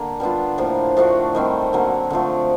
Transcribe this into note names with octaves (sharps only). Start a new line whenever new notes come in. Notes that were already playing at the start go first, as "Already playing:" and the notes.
Already playing: D3 A#3
G3 B3 D4 F4
A2 F3 A#3
F3 A3 D4 F#4
D#3 G3 C4
D3 F#3 A#3
D3 F3 A3